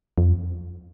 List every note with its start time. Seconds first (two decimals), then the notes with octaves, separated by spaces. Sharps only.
0.18 F2